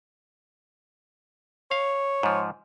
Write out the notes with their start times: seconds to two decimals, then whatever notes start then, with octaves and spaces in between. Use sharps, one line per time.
1.71 C#5 F5
2.23 G#2 F3